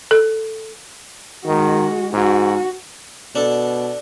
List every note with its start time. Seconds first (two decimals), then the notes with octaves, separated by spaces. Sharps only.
0.11 A4
1.46 D#3 G#3 F#4
2.13 G#2 F#4
3.35 B2 D4 A4